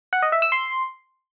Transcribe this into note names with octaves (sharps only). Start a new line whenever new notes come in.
F#5
D#5
E5
E6
C6